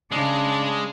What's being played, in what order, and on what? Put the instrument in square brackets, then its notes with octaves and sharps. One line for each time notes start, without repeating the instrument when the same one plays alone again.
[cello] C#3 D4 [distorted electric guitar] G#3